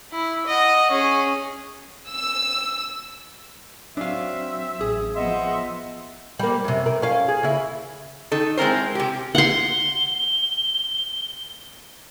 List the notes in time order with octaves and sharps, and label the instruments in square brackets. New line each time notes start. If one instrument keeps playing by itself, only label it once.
[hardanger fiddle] E4
D#5 F#5
C#4 G#4
[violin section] E6
[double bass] F#3 C4 [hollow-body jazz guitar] D4 F5 [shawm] E5
[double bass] A1 [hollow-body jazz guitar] G#4
[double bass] F3 B3 [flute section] D#5 F#5 C6 [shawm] E5
[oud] G3 A#3
F#2 C3
A#4
C#4 F5
G#4
C#3 E4
[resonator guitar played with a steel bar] D#3 D#4 A4
G#3 C4 E4 A#4 C5
C3 G4
[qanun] F#5 C6 [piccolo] G7